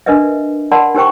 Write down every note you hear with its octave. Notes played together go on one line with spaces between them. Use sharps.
D4 A#4 B4 D#5 E5
A#4 D5 F#5 A5 B5 C6
D#4 G4 A#4 C5 G5 C#6